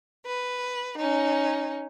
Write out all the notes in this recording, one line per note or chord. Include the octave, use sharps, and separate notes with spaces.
B4
C#4 D#4